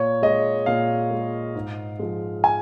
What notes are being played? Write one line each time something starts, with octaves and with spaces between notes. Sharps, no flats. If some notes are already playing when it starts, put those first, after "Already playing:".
Already playing: A#2 C#5
G#3 D#5
A#2 F5
G#3
G#2
F3 G#3
G#5